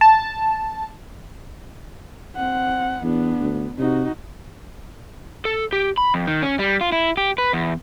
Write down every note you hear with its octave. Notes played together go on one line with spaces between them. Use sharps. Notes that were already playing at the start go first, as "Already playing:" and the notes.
A5
C4 F#5
E2 B3 D4
D2
C3 D#4 F#4
A4
G4
B5
F2
D#3
C#4
G3
F4
E4
G4
B4
E2